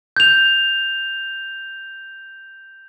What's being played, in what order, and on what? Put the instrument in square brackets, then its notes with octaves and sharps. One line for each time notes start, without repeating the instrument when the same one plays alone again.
[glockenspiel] G6 F7